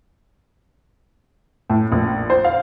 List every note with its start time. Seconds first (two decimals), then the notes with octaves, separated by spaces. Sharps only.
1.70 A2
1.92 A#1
2.30 C5
2.44 F5